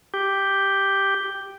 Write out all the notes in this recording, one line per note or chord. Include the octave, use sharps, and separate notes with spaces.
G4